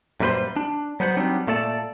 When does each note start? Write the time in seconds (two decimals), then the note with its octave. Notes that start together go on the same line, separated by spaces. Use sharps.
0.20 F#2 A#2 G3 B4 C5 C6
0.56 D4
1.00 F#3 B3 C5 F#5
1.17 F#3 G3 B3 C4 D4 D#4
1.47 A#2 A3 A4 D5 A5